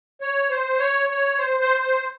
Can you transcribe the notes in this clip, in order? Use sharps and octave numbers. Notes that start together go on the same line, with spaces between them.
C#5
C5
C#5
C#5
C5
C5
C5